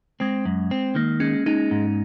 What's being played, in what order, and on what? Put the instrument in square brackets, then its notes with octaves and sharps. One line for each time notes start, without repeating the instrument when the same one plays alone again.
[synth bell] G#3 [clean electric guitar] C4
[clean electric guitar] F#2
C4
[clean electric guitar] D#3 [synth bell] A#3
[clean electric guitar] G#3 [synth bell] C#4
[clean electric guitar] G#3 [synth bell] D#4
[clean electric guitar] G#2